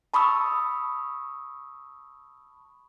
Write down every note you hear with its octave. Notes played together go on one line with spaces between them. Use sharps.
A5 B5 C#6 D#6 E6